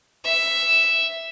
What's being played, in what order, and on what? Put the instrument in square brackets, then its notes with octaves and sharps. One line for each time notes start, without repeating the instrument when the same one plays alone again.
[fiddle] E5